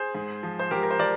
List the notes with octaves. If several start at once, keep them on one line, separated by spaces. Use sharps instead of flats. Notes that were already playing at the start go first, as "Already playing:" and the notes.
Already playing: G#4 C5
G#2
F3
C5
G#2 G4 A#4
A#4
C5
F3 A#4 D5